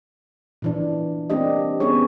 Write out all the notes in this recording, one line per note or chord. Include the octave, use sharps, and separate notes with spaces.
A#2 E3 D4
A#3 C4 D4 G4 D#5
B3 C#4 D#4 G#4 C#5